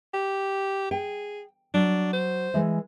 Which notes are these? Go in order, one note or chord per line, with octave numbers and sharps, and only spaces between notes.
G4
G#4 G5
F#3 D4
C5
E3 G#3 E5